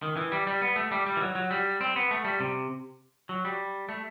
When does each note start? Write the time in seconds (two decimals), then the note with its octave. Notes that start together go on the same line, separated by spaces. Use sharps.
0.02 D#3
0.16 E3
0.32 G3
0.47 G3
0.62 B3
0.76 A3
0.91 G3
1.06 G3
1.17 E3
1.21 F#3
1.35 F#3
1.51 G3
1.81 C4
1.96 B3
2.11 A3
2.25 G3
2.40 C3
3.29 F#3
3.45 G3
3.89 A3